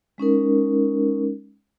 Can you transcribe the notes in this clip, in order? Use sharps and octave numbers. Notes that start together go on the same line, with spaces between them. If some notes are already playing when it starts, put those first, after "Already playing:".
G#3 C#4 D#4 A#4